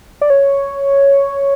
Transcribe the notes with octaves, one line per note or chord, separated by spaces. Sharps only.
D5
C#5